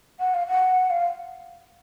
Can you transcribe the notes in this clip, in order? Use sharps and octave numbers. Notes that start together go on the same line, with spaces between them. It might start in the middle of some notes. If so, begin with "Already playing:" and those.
F#5
F5
F#5
F5